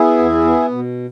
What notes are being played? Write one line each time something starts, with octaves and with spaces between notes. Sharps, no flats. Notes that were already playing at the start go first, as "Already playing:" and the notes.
Already playing: B3 E4 G#4
E2
B3
B2